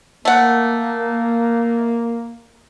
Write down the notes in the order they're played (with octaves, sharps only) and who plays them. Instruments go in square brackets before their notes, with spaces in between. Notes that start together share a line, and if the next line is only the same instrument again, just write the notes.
[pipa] A3 F#5 [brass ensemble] A#3